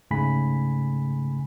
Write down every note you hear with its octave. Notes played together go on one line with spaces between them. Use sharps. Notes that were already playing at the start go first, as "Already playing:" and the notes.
G#2 C#3 A3 G#5 B5 B6